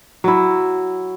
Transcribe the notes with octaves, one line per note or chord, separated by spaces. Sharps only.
F#3 E4